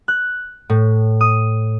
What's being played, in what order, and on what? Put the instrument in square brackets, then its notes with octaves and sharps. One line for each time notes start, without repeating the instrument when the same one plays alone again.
[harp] F#6
A2
D#6